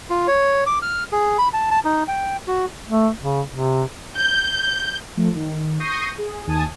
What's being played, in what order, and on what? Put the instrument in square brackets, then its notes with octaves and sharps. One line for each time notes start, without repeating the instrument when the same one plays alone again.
[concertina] F4
C#5
D6
F6
G#4
B5
A5
A5
D#4
G5
F#4
[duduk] A3
C#3
C3
[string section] G6
[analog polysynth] F3 A3
D#3
C#6 D#6 G6 A#6 C7 D#7
G#4
D#2 G#5 A5 D#6